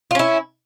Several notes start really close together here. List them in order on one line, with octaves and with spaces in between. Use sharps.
F4 C#4 E4